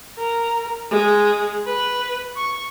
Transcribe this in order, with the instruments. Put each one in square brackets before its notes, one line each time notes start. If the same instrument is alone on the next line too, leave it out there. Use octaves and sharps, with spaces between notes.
[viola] A#4
G#3
B4
C#6